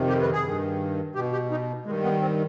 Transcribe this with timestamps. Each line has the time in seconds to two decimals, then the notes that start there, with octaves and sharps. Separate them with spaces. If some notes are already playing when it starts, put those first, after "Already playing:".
Already playing: F2 C3 D#3
0.09 G4
0.22 B4
0.32 G#4
0.45 G2 D#3
1.15 B2 G4
1.32 G4
1.51 D#4
1.86 G2 D#3 G#3
2.04 B3
2.21 C4